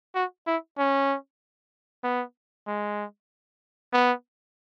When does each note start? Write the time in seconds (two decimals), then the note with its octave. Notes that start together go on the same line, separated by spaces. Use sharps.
0.15 F#4
0.47 E4
0.78 C#4
2.04 B3
2.67 G#3
3.93 B3